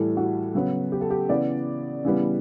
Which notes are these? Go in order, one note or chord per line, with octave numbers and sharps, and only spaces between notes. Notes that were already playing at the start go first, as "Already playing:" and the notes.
Already playing: A2 E3 G3 A4
F#4
C#3 F#3 B3
G4
A4
G4
C#3 E3 B3 D5
C#3 E3 G3 B3